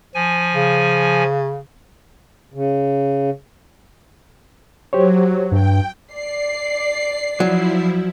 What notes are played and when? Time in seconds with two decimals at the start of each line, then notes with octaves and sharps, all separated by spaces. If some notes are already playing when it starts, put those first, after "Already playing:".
0.15 F3 G#5
0.54 C#3
2.54 C#3
4.93 F#3 G4 C5 C#5
5.52 G2 G5
6.13 D5 C7
7.40 F3 F#3 E4